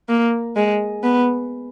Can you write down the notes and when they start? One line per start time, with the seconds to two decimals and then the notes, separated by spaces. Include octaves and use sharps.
0.09 A#3
0.56 G#3
1.03 B3